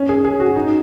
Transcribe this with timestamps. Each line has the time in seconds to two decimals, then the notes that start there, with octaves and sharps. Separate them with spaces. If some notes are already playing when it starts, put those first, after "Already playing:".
Already playing: C#4
0.09 G#4
0.25 G#4
0.40 F#4
0.56 D#4